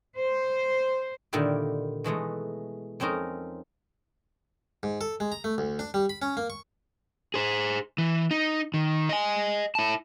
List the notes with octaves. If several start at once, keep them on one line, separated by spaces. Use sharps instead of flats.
C5
A#2 D3 D#3 E4 G4
B2 E3 G#3 A3
F2 C4 C#4 D#4 A#4
G#2
A4
G#3
A#5
A3
D2
D4
G3
B5
C#4
A#3
C#6
G#4 C5
E3
D#4
D#3
D#5 G#5
E4 A5